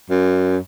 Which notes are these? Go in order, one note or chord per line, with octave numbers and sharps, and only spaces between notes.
F#2